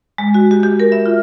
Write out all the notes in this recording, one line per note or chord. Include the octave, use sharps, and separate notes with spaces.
G#3
F#4
G4
G4
A#4
E5
F4